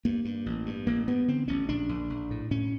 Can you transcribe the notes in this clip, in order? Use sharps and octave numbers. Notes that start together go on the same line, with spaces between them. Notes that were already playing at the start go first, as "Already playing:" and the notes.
G2 A#3
G2
A1
G2
A1 A#3
G2 B3
D3 C4
A1 C#4
A#1 D4
A#1
A#1
A2
A2 C#4